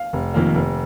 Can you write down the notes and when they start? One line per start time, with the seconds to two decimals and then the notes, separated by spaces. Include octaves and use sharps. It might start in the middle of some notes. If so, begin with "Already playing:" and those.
Already playing: F5
0.13 F1
0.34 F2 D#3 A#3
0.55 F1